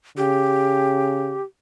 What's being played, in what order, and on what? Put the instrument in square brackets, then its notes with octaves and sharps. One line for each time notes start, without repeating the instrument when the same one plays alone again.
[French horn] C#3 [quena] G4